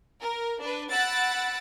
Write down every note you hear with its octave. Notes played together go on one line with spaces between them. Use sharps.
A#4
D4 B4
F#5 B5 E6 F#6 A6 D7